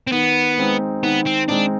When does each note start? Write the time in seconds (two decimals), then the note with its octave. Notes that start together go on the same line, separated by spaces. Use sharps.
0.07 C4
0.12 D#3 B3
0.58 G#3 C4 D#4
1.03 D#3 B3
1.26 C4
1.49 G#3 C4 D4 D#4